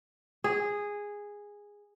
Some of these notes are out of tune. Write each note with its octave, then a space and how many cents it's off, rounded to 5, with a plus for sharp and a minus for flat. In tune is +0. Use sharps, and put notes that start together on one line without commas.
G#4 -10